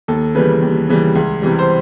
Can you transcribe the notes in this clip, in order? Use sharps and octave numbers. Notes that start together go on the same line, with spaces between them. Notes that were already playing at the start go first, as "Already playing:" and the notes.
D#2 A4
C#3 E3 G3 B4
D#2
C#3 E3 G3
C#2
C3 E3 G3
C5